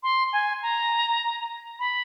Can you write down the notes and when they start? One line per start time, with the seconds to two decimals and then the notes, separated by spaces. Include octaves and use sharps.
0.03 C6
0.33 G#5
0.63 A#5
1.79 B5